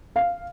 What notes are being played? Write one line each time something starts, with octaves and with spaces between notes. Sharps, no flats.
F5